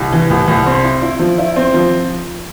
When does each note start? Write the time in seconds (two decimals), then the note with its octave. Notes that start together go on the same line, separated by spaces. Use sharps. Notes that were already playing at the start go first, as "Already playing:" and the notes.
Already playing: C2
0.12 E3
0.30 C2
0.48 C2
0.66 C4
0.84 E4
1.02 E4
1.19 F3
1.38 E4
1.56 C4
1.74 F3